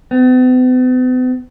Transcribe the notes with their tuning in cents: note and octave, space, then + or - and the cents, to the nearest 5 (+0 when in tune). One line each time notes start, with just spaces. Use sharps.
B3 +45